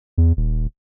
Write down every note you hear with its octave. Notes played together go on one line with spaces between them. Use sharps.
E2
D#1